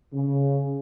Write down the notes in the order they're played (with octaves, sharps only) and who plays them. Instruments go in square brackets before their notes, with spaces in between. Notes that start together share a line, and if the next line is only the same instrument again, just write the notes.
[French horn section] C#3